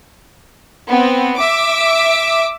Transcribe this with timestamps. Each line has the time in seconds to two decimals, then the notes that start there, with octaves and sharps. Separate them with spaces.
0.88 B3 C4
1.38 E5 D6